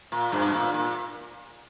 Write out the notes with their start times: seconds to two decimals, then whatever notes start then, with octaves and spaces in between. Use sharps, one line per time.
0.12 A#2
0.32 G2
0.45 B2
0.54 A#2
0.74 A#2